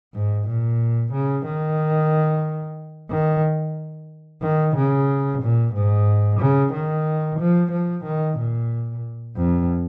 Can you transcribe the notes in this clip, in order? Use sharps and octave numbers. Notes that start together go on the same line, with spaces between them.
G#2
A#2
C#3
D#3
D#3
D#3
C#3
A#2
G#2
C#3
D#3
F3
F3
D#3
A#2
F2